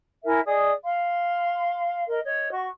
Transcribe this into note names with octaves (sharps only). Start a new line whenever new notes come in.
E4 A#4 E5 G#5
G#4 D5 D#5 D#6
F5 C6
A#4 D#5
C#5 D#5
F#4 C#6